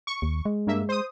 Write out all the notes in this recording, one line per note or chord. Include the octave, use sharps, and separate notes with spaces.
C#6
D#2
G#3
G2 A#3 E5
C5 D#6